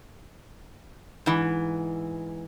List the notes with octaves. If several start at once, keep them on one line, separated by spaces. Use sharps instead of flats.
G#2 E3